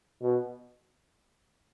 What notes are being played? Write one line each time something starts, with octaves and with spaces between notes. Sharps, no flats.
B2